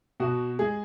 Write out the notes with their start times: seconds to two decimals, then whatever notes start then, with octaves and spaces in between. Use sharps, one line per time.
0.20 B2 F#4
0.59 G#3 G#4